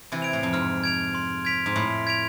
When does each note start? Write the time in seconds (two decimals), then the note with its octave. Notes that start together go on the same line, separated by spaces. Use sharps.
0.12 C3 E3
0.22 G#6 D7 F7
0.33 A2
0.43 F2
0.53 G#2 F6
0.84 G#6 D7 F7
1.15 C6
1.45 G#6 B6 D7 F7
1.66 G#2
1.76 A2 C6
2.07 G#6 B6 D7 F7